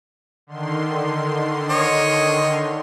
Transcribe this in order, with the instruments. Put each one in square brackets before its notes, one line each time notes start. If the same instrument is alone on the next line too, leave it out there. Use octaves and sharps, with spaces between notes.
[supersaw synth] D3 D#3 C6
[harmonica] C#5 D#5